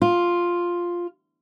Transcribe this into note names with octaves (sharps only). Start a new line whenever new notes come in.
F4